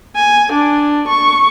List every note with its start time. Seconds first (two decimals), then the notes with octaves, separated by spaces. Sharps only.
0.16 G#5
0.52 D4
1.08 C#6